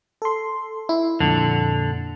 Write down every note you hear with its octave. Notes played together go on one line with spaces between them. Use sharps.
A4 C6
E4
F2 A#2 D3